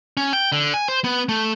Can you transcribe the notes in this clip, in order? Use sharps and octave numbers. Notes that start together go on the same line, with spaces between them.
C#4
G5
D3
G#5
C5
B3
A3